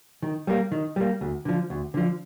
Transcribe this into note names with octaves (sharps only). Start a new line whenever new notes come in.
D#3
G3 A#3
D#3
G3 A#3
D2
D3 F3
D2
D3 F3